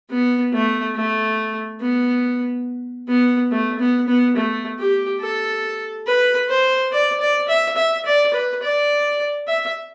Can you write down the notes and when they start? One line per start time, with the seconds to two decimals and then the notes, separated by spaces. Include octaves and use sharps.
0.10 B3
0.53 A3
0.95 A3
1.81 B3
3.08 B3
3.51 A3
3.79 B3
4.08 B3
4.36 A3
4.79 G4
5.21 A4
6.06 B4
6.48 C5
6.92 D5
7.20 D5
7.48 E5
7.77 E5
8.05 D5
8.33 B4
8.62 D5
9.48 E5